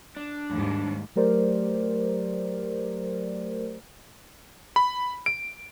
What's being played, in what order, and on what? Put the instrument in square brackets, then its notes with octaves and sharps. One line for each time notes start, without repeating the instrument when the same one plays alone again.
[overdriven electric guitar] D4
[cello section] D#2 G#2 G3
[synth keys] F#3 A3 G4 A#4 C5 D5
[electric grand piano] B5
D7